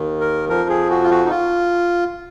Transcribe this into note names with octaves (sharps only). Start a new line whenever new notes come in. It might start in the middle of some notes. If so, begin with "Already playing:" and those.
Already playing: D#2 D#3
A#4
F2 F3 A#4
G#4
F#4
F4
F#4
D#4
F4